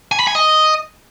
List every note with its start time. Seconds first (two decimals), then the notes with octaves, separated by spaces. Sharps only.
0.12 G#5
0.19 B5
0.27 G#5
0.35 D#5